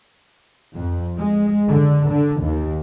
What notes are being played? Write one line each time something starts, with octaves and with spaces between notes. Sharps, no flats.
F2
G#3
D3
D3
D#2